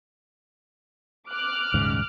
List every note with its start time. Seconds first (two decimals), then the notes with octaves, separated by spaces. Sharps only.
1.28 D6 F6 F#6
1.74 D#1 G#2 C#3